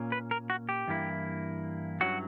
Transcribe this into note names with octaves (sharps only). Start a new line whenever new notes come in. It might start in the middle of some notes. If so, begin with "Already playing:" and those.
Already playing: A#2 A#3 C#4
B4
A#4
F#4
G4
G2 E3 A#3 E4
G2 F#3 C#4 E4 F#4